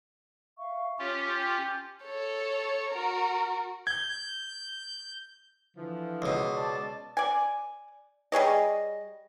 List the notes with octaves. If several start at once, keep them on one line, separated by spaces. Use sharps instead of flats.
E5 F5 C#6
C#4 F4 G4 C#5
G5 G6
A4 C#5
F#4 A#4
G6 G#6
D3 E3 F3
C#2 B2
D5 A5
D5 G#5
G3 G#4 C#5 D#5